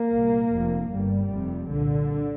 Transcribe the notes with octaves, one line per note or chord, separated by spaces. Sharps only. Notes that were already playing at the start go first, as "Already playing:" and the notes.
Already playing: A#3
C2 A#2
F1 F2 C3
G1 G2 G3
F1 F2 C3
C2 A#2 D3